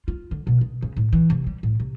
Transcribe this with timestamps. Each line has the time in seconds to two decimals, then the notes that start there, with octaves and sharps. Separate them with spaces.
0.08 F4
0.31 D3
0.47 B2
0.61 C#3
0.82 C#3
0.97 A2
1.13 E3
1.30 C3
1.47 G3
1.63 A2
1.80 C3